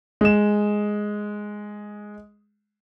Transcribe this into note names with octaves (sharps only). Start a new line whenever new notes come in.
G#3 E7